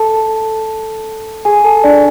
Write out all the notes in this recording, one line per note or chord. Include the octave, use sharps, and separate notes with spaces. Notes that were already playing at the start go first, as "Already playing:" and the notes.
Already playing: A4 A5
G#4 G#5
A4 A5
D4 D5